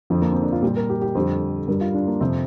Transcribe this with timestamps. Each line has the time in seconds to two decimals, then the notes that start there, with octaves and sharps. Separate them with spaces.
0.10 F2 D3 F3
0.22 A#3
0.32 C4
0.42 D4
0.52 F4
0.62 A#2 G3 G4
0.76 A#4
0.90 G4
1.02 G4
1.15 F2 D3 G3 C5
1.68 G2 G3 A#4
1.81 F4
1.95 D4
2.07 A#3
2.21 F2 C3 F3 C4